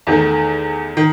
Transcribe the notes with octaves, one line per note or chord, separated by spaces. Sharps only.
E2 D#3 A3
D#3